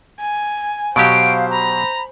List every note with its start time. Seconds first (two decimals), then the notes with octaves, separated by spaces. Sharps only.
0.20 G#5
0.96 B2 F#3 G4 C5 F5 D7
1.50 A#5 B5